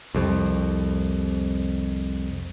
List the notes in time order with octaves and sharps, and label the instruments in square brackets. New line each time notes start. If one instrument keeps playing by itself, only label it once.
[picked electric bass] C2 F2